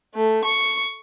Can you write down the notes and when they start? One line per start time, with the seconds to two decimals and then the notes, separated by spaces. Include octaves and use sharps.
0.14 A3
0.44 C#6